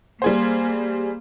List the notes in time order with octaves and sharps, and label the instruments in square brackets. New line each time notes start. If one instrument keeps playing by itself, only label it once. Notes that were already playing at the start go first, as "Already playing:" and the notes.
[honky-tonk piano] G3 G#4 C5 [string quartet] A#3